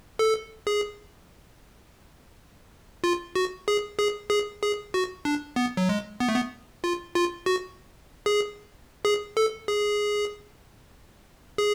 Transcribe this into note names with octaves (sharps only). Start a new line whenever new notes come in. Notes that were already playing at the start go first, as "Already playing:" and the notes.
A4
G#4
F4
F#4
G#4
G#4
G#4
G#4
F#4
D4
B3
F#3
G#3
B3
A3
B3
F4
F4
F#4
G#4
G#4
A4
G#4
G#4